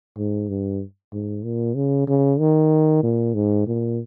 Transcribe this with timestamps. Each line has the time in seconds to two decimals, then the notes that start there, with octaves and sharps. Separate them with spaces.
0.17 G#2
0.49 G2
1.13 G#2
1.44 A#2
1.76 C#3
2.08 C#3
2.40 D#3
3.03 A#2
3.35 G#2
3.67 A#2